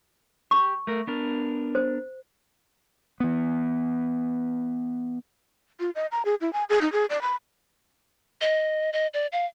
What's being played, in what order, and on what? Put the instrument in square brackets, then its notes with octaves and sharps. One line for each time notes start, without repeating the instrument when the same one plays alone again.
[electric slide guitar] G4 [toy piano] C#6
[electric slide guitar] A3 A#4
B3 D4 A#4
[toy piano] C5
[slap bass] E3 B3
[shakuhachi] F4
D#5
A#5
G#4
E4
G#5
G#4
D#4
G#4
D5
B5
[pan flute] D#5
D#5
D5
F5